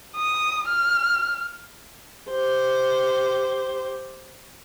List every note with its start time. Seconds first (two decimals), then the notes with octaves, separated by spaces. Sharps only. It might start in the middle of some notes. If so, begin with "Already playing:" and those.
0.16 D#6
0.68 F6
2.30 G4 C5